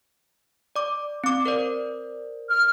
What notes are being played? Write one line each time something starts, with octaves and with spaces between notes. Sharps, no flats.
D5 D6
C4 D6
A#4 C5 D5
F6